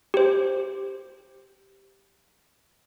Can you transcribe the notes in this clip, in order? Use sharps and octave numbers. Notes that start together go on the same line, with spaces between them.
G4 C5